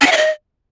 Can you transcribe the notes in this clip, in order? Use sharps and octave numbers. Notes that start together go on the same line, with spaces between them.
C#4
F#5
E5
D#5